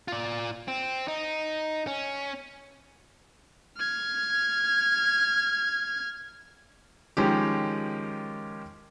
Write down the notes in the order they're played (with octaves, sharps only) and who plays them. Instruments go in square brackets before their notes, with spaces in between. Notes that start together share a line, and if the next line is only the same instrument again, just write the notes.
[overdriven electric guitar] F4 D5
C4
D#4
C#4
[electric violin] F6 G#6
[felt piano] D#3 F3 G#3 C#4 G4